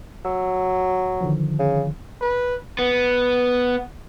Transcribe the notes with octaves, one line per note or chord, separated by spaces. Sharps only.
F#3 E6
D3 D#3 F3
C#3
B4
B3